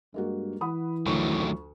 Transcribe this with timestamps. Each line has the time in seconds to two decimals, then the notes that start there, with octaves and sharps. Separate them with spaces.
0.14 G2 G#3 A#3 F#4
0.61 E3 F#5 B5 D#6
1.06 D2 D#3 F3 F#3 A3 C#6